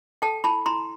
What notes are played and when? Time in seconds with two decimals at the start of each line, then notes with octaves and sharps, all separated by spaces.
0.22 A4 G5 A5
0.44 E4 A5 B5
0.66 E4 A#5 C6